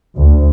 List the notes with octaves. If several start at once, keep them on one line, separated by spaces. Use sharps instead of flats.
D2